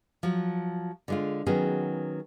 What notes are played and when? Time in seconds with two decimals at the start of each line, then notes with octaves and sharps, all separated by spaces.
0.23 F3 F#3
1.08 D3 G#3 F4
1.46 D#3 F#3 B3 C#4 G#4